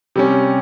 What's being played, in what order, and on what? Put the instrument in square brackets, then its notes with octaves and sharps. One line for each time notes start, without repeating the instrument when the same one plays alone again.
[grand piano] C3 G3 C#4